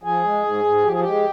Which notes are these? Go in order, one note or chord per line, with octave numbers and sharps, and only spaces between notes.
F3 G#4
G#3
G#2
G#2
F3 G4
G#4
G4
G#3